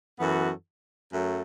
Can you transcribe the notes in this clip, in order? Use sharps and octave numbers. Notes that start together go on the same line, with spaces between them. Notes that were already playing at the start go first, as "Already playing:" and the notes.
F#2 E3 B3 F#4 A4
F#2 F#3 A3